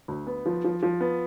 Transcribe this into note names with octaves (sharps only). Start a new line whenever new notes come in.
D2
B3
F3
F3
F3
B3